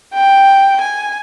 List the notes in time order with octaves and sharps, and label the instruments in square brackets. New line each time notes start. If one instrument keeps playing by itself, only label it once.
[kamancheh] G5
G#5